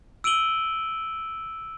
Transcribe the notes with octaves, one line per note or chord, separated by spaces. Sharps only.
E6 D7 D#7 F#7 G7